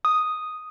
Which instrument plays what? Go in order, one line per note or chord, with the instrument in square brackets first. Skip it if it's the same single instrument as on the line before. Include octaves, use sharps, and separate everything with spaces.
[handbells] D#6